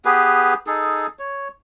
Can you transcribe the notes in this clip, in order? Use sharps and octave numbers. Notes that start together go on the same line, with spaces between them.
B3 G4 G#4 B4
D#4 G#4 A4
C#5